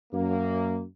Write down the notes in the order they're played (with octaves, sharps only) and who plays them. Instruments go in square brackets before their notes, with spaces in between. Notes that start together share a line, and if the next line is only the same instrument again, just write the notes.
[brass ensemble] F#2 A#3